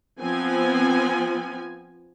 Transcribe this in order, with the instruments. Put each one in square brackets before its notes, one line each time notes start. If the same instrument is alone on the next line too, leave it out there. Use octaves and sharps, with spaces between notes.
[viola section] F3 B3 C4 G#5